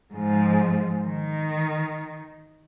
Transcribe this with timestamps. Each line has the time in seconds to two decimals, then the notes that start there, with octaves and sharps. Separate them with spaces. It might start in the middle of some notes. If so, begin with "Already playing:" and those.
0.14 G#2 F3
1.05 D#3